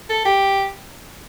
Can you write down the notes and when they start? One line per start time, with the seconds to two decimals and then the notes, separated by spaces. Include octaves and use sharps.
0.09 A4
0.25 G4